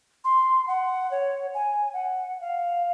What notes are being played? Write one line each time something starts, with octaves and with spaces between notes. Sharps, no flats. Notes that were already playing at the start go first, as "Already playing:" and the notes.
C6
F#5
C#5
G#5
F#5
F5